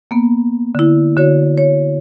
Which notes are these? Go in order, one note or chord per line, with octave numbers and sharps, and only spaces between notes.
A#3 B3
D3 E4
D3 F#4 C#5
C#5